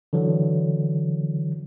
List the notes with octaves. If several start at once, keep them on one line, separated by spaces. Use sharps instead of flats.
D3 E3 F#3